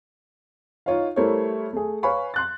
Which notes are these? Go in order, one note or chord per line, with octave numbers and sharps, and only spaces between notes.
D#4 F4 C#5 D#5 F5
G3 A3 E4 A#4 C5 C#5
A3 G#4
B4 C#5 F5 G#5 B5 C#6
C6 F#6 A6